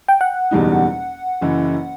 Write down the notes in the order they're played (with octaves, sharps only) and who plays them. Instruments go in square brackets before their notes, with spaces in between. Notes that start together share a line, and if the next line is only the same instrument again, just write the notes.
[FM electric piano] G5
F#5
[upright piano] F#1 E2 B2 G3 D#4
F#1 F#2 E3